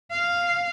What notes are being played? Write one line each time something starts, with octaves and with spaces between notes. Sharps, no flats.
F5